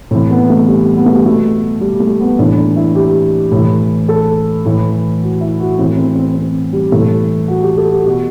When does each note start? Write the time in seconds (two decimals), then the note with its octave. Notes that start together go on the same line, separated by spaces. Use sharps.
0.11 A2 C4
0.15 E3
0.31 B3
0.50 A3
0.68 G3
0.97 B3
1.06 A3
1.16 G3
1.24 B2 A3
1.81 G3
2.00 A3
2.20 B3
2.39 A2 E3 D4
2.57 D4
2.76 E4
2.95 G4
3.52 A2
3.57 E3
4.09 A4
4.66 A2 E3
5.22 F#4
5.41 E4
5.60 F#4
5.79 A2 E3 C4
5.98 C4
6.16 C4
6.35 C4
6.73 G3
6.92 A2 E3 A3
7.48 F#4
7.62 G4
7.77 A4
7.91 G4
8.06 B2 F#4